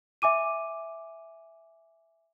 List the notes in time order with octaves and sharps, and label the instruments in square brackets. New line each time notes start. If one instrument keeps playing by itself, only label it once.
[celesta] E5 G#5 D6 D#7